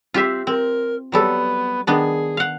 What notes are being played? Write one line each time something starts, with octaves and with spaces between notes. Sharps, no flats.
C4 F4 G4 E5
C4 A#4
F#3 G3 B3 A4
D#3 B3 D4 G#4
F5 F#5